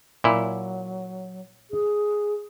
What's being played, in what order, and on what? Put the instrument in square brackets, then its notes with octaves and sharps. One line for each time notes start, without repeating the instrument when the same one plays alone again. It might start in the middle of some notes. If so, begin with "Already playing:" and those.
[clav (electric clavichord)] A#2 E4 [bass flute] F#3
[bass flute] G#4